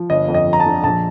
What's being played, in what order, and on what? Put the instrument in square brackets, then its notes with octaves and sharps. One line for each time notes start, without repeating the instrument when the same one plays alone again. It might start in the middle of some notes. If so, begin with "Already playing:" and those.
Already playing: [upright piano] F3
G1 D#5
F2
D#5
F3
A#5
A5
D3
A#1 A5